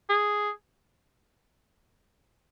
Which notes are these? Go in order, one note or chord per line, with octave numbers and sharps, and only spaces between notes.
G#4